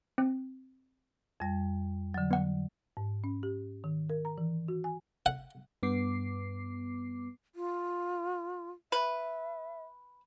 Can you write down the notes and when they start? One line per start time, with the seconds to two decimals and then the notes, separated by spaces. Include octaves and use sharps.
0.18 C4
1.40 F2 G3
2.14 D3 F#3
2.31 B3 F#5
2.97 G#2
3.24 C#4
3.43 G4
3.84 D#3
4.10 A#4
4.25 A#5
4.38 E3
4.68 F#4
4.84 G#5
5.26 F#5
5.83 G2 B3 D6 C7
7.55 F4
8.92 B4 E5